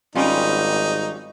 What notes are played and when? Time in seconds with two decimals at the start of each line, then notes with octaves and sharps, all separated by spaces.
0.15 G#1 G3 C#4 D#4 F4